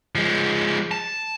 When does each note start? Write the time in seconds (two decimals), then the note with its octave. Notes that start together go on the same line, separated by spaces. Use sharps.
0.15 F3 G#3
0.91 A5